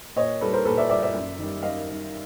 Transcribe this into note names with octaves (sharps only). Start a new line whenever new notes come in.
A#2 C#5 D#5
G3 A4 B4
A#4 C5
A#2 A4 B4
D5 E5
G3 D5 E5
D5 E5
F#2
D#3 G3
F#2 D#5 F5
D#3 G3